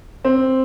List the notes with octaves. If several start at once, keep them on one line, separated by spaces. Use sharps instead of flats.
C4